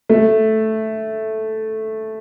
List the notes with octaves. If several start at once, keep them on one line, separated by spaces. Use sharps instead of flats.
A3